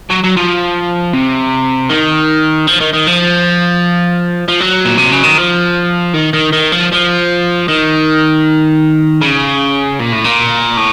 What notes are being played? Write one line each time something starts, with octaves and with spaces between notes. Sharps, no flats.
F#3
F#3
F3
C3
D#3
F3
D#3
D#3
F3
F3
F#3
A#2
C3
C#3
D#3
F3
D#3
D#3
D#3
F3
F3
D#3
C#3
A#2
A2
A#2
A2